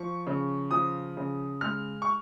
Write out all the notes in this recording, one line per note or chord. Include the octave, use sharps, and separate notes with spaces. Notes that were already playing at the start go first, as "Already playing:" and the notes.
Already playing: F3 C#6
C#3
F3 D#6
C#3
G#3 F6
C#6